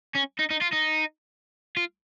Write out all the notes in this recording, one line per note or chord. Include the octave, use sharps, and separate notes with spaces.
C#4
D#4
D#4
F4
D#4
F4